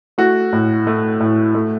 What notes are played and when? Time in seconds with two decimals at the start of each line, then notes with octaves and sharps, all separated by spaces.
0.18 A3 F#4
0.53 A2
0.87 A3
1.20 A2
1.55 A3